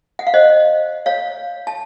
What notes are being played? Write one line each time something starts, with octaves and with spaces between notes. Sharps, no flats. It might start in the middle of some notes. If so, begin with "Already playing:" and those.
F#5
F5
C5 D#5
C#5 F5
A5